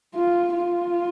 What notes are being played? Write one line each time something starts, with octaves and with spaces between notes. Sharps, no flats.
F4
F4